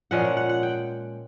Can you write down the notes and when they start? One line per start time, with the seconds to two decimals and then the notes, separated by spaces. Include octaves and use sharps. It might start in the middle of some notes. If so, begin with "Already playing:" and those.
0.11 A#2 F3 G#3 C#4 F#5
0.24 F#5
0.37 F#5
0.49 F#5
0.63 G5